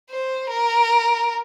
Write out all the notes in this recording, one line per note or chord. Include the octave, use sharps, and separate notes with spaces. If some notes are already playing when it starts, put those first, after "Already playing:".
C5
A#4